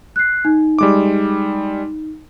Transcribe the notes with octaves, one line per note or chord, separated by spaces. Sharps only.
F#6 C7
D#4
G3 G#3 D6